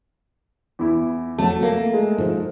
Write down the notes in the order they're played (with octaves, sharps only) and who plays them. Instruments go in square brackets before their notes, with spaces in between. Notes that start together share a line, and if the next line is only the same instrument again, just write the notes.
[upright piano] E2 E4
[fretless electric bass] F2 F#3 [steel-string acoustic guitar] A3 [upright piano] A5
[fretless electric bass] A#3
[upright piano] G#3
[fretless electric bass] G#2 F3